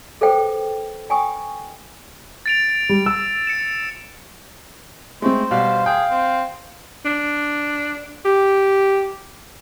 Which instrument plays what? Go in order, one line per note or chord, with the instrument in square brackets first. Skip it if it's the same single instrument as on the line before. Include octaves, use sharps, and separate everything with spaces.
[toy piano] G#4 A4 B4 C5 G5
G5 G#5 B5 C#6 D#6
[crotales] A6 D7 F7
[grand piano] G3
E6
[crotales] C#7 E7
[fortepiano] G#3 C4 [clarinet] A3 [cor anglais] C5
[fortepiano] B2 G3 [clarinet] F5
[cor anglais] G#4 [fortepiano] G5
[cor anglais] C4
[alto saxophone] D4
G4